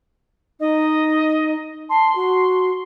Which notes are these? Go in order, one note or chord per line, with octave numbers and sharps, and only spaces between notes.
D#4 D#5
A5 C6
F#4